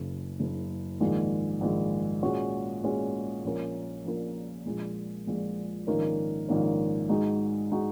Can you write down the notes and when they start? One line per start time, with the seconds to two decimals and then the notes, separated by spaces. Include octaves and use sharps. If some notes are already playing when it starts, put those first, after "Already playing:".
Already playing: F#1 F#2 C#3
0.39 F#1 F#2 C#3
1.00 A#1 G#2 D#3 G#3
1.61 A#1 G#2 D#3 G#3
2.23 A#2 G#3 C#4 F#4
2.84 A#2 G#3 C#4 F#4
3.44 A#1 A#2 A#3 C#4 A#4
4.05 A#1 A#2 A#3 C#4 A#4
4.66 A#1 A#2 G#3
5.27 A#1 A#2 G#3
5.87 A#1 G#2 D#3 A#3 C#4
6.49 A#1 G#2 D#3 A#3 C#4
7.09 G#2 G#3 D#4 F#4
7.72 G#3 D#4 F#4